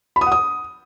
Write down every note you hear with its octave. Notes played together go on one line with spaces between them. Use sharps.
B5
D#6
F#5
D#6